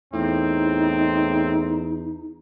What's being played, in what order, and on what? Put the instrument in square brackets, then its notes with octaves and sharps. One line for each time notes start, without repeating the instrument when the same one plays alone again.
[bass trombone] E2 [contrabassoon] A2 [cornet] C4 [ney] D#4